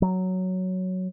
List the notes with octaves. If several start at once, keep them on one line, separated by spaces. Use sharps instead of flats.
F#3